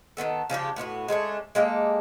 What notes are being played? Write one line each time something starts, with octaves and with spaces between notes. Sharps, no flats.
D#3 F#3 B3 A4
C#3 F3 D4 G4
A2 B3 F4 F#4
G#3 A3 C#4 D4
G#3 A#3 G4 A4